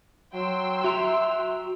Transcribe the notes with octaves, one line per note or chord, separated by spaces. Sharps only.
F#3 G5 C6 E6
F#4 E5 A#5